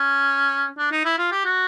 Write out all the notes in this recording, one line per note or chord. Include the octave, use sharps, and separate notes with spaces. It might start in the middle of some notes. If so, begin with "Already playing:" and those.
Already playing: C#4
D4
D#4
E4
F4
G4
F#4